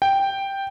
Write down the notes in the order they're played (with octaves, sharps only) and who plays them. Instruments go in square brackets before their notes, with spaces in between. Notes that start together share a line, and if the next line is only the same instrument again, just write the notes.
[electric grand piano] G5